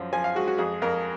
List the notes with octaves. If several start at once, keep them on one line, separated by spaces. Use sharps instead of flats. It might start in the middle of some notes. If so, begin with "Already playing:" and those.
Already playing: F#2 F3
F3 G#5
F5
G#3 F#4
F#4
F2 G#4
F2 A#4